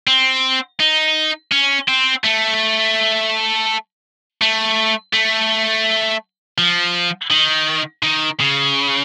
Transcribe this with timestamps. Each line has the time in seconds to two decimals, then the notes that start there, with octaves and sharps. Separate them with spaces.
0.07 C4
0.80 D#4
1.52 C#4
1.89 C4
2.24 A3
4.42 A3
5.13 A3
6.58 F3
7.31 D#3
8.03 D#3
8.40 C#3